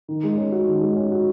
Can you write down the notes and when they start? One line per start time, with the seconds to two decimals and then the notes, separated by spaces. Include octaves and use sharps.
0.08 D#3
0.24 G#3
0.38 C#4
0.52 F#4
0.67 D#3
0.81 G#3
0.96 C#4
1.11 F#4